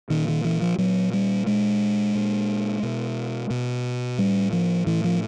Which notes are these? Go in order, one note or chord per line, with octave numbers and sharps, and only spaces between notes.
A#2 D#3
D#3
E3
F3
A#2 F#3
G3
A#2 G#3
A#2
B2
B2
A2 G3
F3
A2 E3
F3